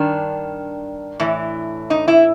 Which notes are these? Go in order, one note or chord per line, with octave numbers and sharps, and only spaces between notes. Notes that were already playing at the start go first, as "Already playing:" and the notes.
Already playing: G2 D#3 D4
A2 E3
D#4
E4